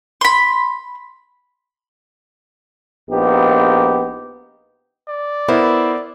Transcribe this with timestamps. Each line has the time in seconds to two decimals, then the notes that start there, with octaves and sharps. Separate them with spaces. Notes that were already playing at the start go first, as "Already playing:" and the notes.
0.21 B5 C6
3.10 A#1 B3 D#4 G4
5.08 D5
5.48 B3 E4 A#4 C5